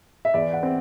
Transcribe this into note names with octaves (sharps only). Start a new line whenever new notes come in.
E5
E2 D5
F#5
C4